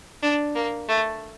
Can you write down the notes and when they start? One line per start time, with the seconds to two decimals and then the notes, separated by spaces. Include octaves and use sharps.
0.22 D4
0.55 A#3
0.89 A3